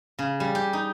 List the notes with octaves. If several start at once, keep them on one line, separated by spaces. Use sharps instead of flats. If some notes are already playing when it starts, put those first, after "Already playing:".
C#3
G3
G4
D#4